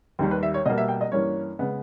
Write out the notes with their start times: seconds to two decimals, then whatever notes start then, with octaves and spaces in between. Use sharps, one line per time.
0.19 D#2 D#3 G3
0.31 B4
0.43 E5
0.54 C#5
0.66 B2 G3 A#3 D#5
0.78 E5
0.88 G5
1.01 D#5
1.12 G2 E3 A#3 C#4 C#5
1.59 C#3 G#3 B3